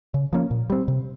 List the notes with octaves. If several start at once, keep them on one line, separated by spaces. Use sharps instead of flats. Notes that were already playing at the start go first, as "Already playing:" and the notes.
C#3
F3 A#3 C#4
A#2
G3 C4
C3